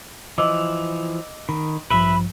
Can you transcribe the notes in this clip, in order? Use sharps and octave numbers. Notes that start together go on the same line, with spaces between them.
E3 F3 D#5 D6 E6
D#3 B5
A1 G2 F3 B4 E5 B5